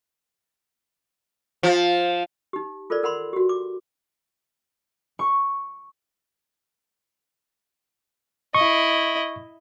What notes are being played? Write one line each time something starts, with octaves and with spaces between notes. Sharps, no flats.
F3
D#4 G4
F4 A4 A#4 C5 D5
A#4 F#5 B5 C6
F#4 G4
D6
C#6
E4 D#5 C#6